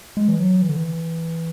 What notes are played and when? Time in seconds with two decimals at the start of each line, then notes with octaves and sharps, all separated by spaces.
0.17 G#3
0.28 E3
0.39 F#3
0.62 E3
0.69 D3
0.76 E3